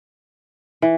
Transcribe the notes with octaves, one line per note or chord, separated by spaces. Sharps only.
E3